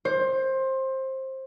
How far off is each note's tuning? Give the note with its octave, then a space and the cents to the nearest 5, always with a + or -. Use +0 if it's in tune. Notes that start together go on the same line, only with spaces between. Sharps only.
C5 +20